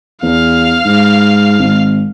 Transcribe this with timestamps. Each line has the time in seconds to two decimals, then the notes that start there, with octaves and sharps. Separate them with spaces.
0.23 E2 F5
0.85 G#2
1.59 G#1